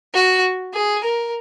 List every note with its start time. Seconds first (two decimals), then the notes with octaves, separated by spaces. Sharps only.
0.14 F#4
0.74 G#4
1.04 A#4